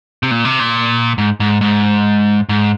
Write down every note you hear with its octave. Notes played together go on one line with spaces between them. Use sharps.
C3
A#2
C3
A#2
G#2
G#2
G#2
G#2